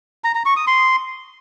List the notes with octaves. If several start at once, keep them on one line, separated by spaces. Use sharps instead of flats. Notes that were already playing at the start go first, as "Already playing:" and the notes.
A#5
A#5
C#6
D#6
C6